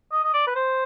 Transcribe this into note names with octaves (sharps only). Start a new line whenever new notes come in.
D#5
D#5
D5
B4
C5